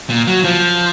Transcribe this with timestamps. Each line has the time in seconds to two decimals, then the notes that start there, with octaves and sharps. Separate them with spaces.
0.10 A#2
0.27 F#3
0.44 F3